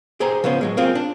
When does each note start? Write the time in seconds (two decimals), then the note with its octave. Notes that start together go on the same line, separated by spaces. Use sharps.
0.20 G4 G#4 C5 A#5
0.44 C#3 F3 B3 C#4 C5
0.61 A2 F#3 G#3
0.77 A#3 C4 F4 G#4
0.95 D4